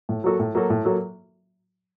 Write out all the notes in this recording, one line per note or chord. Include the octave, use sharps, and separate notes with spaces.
A2
F#3 A#3 F#4 A4
A2
F#3 A#3 F#4 A4
A2
F#3 A#3 F#4 A4